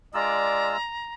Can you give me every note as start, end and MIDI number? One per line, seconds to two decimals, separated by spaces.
0.14 0.77 56
0.14 0.75 62
0.14 0.77 65
0.14 0.75 74
0.14 1.14 82
0.14 0.77 88